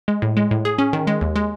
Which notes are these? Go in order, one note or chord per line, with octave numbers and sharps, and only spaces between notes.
G#3
A2
G#3
A2
G#4
C#4
D#3
G#3
D#2
G#3